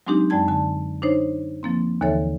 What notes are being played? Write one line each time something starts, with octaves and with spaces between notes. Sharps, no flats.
F#3 G#3 C4 D4 D#4 G4
F#2 G#3 D5 G5 A5 G#6
D3 G#5 A5
D4 D#4 C5 C#5
F3 A#3 C4
D#2 D3 E3 A4 C#5 E5